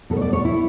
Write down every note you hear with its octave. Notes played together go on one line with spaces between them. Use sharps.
B2 A4
G3 C#5
D5
C#5
E4